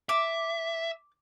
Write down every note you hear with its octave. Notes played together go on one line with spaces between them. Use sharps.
E5 D6